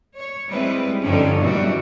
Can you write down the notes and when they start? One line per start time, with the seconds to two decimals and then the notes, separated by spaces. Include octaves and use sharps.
0.16 C#5
0.51 G3 G#3 C4 E4 B4
1.05 G2 D3 F3 C#4 D#4
1.40 B2 D#3 E3 F#3 G3 F#4